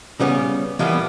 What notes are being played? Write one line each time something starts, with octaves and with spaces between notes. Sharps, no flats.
C#3 G3 B3 C#4
E3 F3 G3 A#3 B3